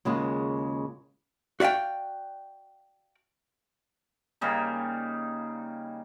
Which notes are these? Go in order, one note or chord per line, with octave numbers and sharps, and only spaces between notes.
D#2 C#3 G#3 F4 F#4
F#4 D5 E5 F5 G5
C#3 G3 A#3 D#4